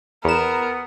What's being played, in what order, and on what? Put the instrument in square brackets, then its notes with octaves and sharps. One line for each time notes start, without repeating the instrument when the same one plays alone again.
[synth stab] E2 E7 [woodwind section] B3 [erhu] A#4